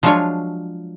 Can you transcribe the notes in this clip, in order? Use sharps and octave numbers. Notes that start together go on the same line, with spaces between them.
F3 F#3 G#3 D4 F4 C#5